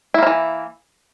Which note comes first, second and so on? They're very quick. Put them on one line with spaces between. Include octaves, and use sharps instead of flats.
E4 A#3 F3 E3